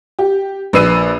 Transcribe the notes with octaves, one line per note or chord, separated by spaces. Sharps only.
G4
A#1 B4 E6 C7 D#7